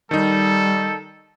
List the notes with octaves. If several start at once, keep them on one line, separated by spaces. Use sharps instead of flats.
D#3 G3 D#4 A4